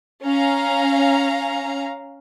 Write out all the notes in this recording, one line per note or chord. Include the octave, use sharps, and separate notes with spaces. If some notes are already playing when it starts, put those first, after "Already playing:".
C#4 F5 A#5